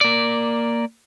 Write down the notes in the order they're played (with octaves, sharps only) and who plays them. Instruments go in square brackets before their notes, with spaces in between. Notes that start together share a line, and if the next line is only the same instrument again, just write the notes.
[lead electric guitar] A#3 D5